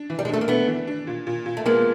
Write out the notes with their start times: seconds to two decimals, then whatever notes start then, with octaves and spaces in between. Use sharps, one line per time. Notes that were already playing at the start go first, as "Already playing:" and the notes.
Already playing: D4
0.10 E3
0.19 G3
0.25 G#3
0.29 A3 D4
0.41 A#3
0.48 A3 B3 D4
0.68 E3
0.87 D4
1.07 A#2
1.27 A#2
1.46 A#2
1.57 A3
1.66 G#3 A#3 B3